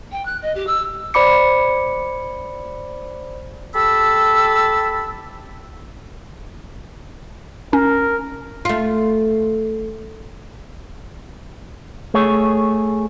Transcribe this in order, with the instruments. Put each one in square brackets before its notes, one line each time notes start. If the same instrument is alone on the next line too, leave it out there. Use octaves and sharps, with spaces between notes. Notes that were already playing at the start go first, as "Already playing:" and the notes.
[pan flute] G5
F#6
D#5
G4
E6
[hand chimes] C5 D5 B5 D6 C#7
[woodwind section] G4 A4 A5 B5 E6
[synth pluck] C#4 [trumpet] A#4
[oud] A3 F4
[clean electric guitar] A3 G#4 C#5